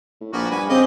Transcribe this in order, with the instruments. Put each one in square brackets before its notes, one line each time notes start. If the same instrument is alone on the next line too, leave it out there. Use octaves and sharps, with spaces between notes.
[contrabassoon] A2
[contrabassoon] A#1 [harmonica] A#3 B3 F#4
[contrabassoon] G2 [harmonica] B4 G#5
[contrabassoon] C#3 [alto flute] C4 [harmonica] G4 G#4 D#5